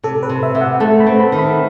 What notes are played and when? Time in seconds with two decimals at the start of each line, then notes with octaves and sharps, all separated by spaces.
0.03 C3 A4
0.23 B4
0.29 C3
0.43 E5
0.55 C3 E5
0.61 F#5
0.80 A3 A5
1.00 B5
1.06 C4
1.20 B5
1.32 D#3
1.39 B5